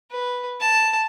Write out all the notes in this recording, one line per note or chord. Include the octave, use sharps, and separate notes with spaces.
B4
A5